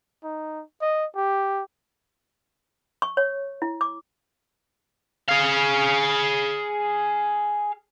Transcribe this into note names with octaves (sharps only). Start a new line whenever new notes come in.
D#4
D#5
G4
C#6
C#5
E4
D6
G#4 F5